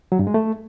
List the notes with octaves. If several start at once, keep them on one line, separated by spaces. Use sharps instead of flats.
F#3
G2
G#3
A3